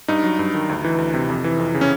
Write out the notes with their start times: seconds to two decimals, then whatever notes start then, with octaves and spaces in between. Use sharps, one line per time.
0.08 G2 D#4
0.24 F#3
0.39 G2
0.54 D#3
0.69 D2
0.84 E3
0.98 D2
1.14 C3
1.30 F2
1.44 E3
1.59 F2
1.74 C#3
1.81 C#4